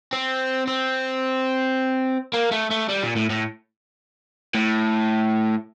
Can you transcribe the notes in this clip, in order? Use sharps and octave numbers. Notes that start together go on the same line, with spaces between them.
C4
C4
A#3
A3
A3
G3
A#2
A2
A2
A2